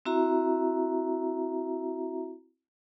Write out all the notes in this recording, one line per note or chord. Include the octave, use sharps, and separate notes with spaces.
C4 E4 F#4 E5 A#5